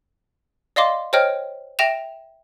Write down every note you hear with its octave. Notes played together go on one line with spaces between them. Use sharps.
D5 D#5 F5 C6 D6
C5 C#5 D#5 G5 F6
E5 G5 A#6 E7 F7